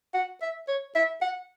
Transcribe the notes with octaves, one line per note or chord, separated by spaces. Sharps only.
F#5
E5
C#5
E5
F#5